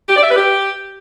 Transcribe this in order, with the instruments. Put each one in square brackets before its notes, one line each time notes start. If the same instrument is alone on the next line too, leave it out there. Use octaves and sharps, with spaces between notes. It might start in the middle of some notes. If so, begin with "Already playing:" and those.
[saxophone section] G4
D5
E5
B4
G4